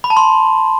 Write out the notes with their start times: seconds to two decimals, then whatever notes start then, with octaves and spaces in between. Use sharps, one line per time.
0.04 B5
0.10 A5
0.17 C6